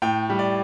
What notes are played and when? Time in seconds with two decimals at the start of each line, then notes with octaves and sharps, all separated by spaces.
0.02 A2 G5
0.30 G3
0.39 D5